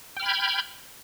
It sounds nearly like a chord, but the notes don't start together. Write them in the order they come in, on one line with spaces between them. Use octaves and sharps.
G5 F6 B5 G#6 G6